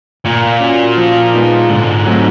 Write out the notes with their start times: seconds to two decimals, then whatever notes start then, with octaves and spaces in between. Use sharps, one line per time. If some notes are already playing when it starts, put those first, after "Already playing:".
0.24 A#2 A#3
0.61 C#4 F#4
0.97 F3
1.33 G#3 B3 D#4
1.69 G#2 D3
2.06 F#3 A3 C4 D#4